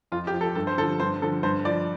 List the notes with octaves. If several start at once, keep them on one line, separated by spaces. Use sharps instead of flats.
F2 F4
G4
F3
A4
G2 A4
C5
D3 F3 A4
G2 C5
D3 F3 A4
G2 C5
F3 D5